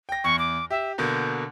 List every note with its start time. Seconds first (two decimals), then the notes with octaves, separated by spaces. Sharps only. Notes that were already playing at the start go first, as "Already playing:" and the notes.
0.09 G5 A#6
0.24 E2 C#6
0.39 D6
0.70 G4 E5
0.98 B2 D3 A#3 G6